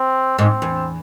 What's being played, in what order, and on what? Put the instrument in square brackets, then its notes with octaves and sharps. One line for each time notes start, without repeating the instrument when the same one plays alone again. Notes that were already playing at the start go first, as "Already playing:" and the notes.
Already playing: [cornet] C4
[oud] G#2 [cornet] C4
[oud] E2